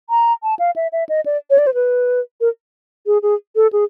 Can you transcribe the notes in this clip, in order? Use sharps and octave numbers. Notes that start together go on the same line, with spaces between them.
A#5
A5
F5
E5
E5
D#5
D5
C#5
D5
C5
B4
A#4
G#4
G#4
A4
G#4